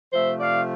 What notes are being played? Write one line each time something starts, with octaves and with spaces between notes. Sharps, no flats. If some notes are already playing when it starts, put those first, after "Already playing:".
C3 F3 A3 C5 E5
D5 F5